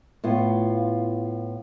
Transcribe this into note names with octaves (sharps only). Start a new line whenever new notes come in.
A2 B3 F4